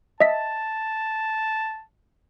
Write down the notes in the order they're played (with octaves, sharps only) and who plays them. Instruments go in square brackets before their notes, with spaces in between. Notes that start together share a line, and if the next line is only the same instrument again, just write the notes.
[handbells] D#5 E5 B6 [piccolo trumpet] A5